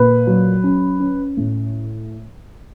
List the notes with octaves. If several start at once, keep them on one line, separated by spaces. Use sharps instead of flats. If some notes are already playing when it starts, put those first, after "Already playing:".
Already playing: A#2 B4
F#3
C#4
C#4
A2